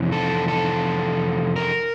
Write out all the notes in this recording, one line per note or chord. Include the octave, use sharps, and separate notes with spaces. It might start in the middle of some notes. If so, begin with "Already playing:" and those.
Already playing: F2 C3 E3
A4
A4
A#4